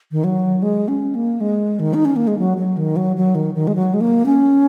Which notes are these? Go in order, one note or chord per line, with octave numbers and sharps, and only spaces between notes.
D#3
F#3
G#3
C#4
A#3
G#3
D#3
D#4
C#4
A#3
G#3
F#3
F#3
D#3
F#3
F#3
D#3
D#3
G#3
F#3
G#3
A#3
C#4